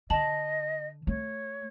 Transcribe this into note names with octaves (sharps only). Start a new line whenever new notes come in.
D3 D#5 A5 F#7
A3 C#5